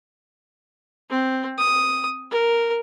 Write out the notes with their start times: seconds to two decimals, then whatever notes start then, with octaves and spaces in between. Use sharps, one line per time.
1.10 C4
1.58 D#6
2.31 A#4